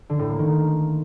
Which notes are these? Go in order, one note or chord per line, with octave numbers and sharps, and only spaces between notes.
D3
A2
A#3
D#3